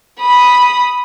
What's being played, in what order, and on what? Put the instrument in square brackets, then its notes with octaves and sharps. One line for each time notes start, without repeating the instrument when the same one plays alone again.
[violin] B5 D#6